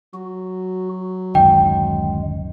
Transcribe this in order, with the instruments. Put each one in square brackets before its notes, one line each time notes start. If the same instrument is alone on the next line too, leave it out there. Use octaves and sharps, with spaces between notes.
[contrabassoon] F#3 [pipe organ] F#4
[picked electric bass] D1 F#2 D#3 [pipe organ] G#3 [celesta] G5